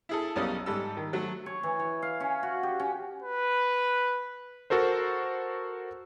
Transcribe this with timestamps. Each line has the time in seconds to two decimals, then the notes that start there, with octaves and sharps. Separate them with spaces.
0.09 E4 G#4 A4
0.36 B1 G3 A#3 C#4 D5 D#6
0.66 G#2 G3 A4 E6
0.97 D#3
1.13 F#3 A3
1.46 C#5
1.63 E3
1.80 C#5
2.02 F5
2.20 C#4
2.43 F#4
2.63 G4
2.80 C#4
3.22 B4
4.70 F#4 A4 A#4 C5